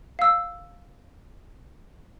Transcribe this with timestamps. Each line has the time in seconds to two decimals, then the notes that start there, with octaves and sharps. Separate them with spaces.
0.19 F5 E6